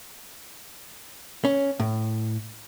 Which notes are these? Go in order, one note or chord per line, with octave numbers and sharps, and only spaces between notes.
C#4
A2